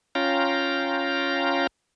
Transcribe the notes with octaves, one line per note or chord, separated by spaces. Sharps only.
C#4 F4 F5 G5 A#5